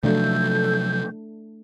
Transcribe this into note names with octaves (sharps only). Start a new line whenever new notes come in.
C3 F3 F#3 A3 D4 A4 G6